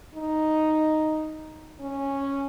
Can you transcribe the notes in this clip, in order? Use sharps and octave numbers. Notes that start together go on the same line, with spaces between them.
D#4
C#4